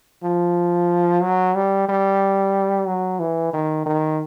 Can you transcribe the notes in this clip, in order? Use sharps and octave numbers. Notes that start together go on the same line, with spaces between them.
F3
F#3
G3
G3
F#3
E3
D#3
D#3